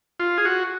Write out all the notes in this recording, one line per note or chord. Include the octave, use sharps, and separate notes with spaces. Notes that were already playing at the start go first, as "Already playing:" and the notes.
F4
G#4
F#4